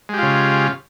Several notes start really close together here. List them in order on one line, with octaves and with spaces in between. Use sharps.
G#3 G4 F4 C#3